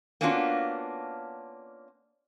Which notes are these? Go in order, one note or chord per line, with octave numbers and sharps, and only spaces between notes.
A#3 B3 C#4 D4 F4 F#4